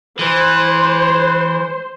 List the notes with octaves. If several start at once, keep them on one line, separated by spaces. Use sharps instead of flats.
E3 C5